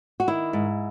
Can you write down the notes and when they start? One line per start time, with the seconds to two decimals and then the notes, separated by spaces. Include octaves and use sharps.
0.20 F#4
0.28 D#3 E4
0.53 G#2